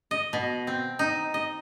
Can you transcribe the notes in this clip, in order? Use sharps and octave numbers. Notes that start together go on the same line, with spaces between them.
D#5
B2
C4
D#4
D#5